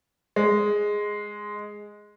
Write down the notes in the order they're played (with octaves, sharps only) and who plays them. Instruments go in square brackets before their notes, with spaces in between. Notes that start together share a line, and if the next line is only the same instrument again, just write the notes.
[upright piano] G#3